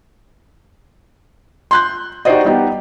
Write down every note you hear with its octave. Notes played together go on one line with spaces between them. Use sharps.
C6 F#6 G6
D#4 F#4 G4 C5 D5 D#5
G3 B3 D#4 G4